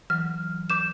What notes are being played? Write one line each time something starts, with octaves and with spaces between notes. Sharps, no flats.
E3 F#3 F6
D6 G6 E7